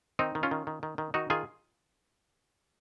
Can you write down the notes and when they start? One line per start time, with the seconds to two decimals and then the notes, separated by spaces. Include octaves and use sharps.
0.19 D#3 C4 D#4
0.35 D#3
0.43 C#4 F4
0.51 D#3
0.67 D#3
0.83 D#3
0.98 D#3
1.14 D#3 D#4 F#4
1.30 D#3 F4 G#4